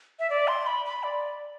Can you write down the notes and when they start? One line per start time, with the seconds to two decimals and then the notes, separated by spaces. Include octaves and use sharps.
0.19 E5
0.30 D5
0.48 C6
0.66 B5
0.85 B5
1.03 D5